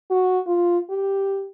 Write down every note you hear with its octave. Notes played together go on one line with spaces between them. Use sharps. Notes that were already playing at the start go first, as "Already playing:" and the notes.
F#4
F4
G4